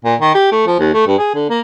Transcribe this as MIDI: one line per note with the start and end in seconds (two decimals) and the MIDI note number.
0.05 0.15 46
0.21 0.31 51
0.35 0.51 67
0.52 0.66 57
0.66 0.75 53
0.80 0.89 39
0.93 1.05 57
1.07 1.17 43
1.19 1.34 68
1.35 1.45 50
1.50 1.61 58